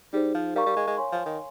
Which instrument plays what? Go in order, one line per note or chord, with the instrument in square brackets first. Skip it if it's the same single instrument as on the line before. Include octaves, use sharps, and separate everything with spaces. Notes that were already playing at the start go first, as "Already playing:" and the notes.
[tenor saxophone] G3 [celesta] D#4 G#4 C5
[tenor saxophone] F3
[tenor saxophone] G3 [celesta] A#4 F5 A#5 C#6
[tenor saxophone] G3
G#3
G#3
[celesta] C#5 F5 G#5 C6
[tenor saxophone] F3
D#3